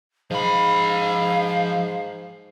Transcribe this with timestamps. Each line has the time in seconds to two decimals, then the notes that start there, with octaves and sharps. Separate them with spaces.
0.31 G#2 F3 F5 B5